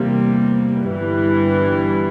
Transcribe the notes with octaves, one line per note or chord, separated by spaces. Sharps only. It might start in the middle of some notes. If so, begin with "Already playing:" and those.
Already playing: E2 C3 G3 A#3
G1 G2 E3 G3